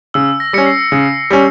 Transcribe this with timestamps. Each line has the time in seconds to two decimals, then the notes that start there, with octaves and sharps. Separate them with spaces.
0.14 C#3 E6
0.40 A#6
0.53 G3 C#4 C#7
0.66 C7
0.92 C#3
1.31 G3 C#4